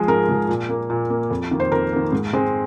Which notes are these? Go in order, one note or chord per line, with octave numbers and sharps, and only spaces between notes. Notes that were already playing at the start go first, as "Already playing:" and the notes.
Already playing: F3 G#3 G#4
G#2 A#4
F3 G#3
A#2
A#3
A#2
A#3
F2
D#3 A#3
C5
F2 A#4
D#3 A#3
G#2
G#3 C4